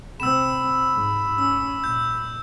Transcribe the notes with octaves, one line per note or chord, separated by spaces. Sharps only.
C3 C4 B5 E6 E7
G#2
C#4 E6
A#2 G6